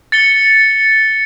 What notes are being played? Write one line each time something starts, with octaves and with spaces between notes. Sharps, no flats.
A6 C#7 G7